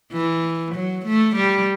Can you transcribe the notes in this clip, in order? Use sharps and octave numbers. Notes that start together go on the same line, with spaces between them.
E3
F#3
A3
G3